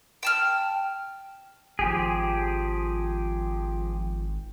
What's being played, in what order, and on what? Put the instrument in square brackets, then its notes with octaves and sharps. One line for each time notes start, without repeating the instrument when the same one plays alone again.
[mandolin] G5 A5 F6
[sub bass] G#1 [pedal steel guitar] F3 G4 G#4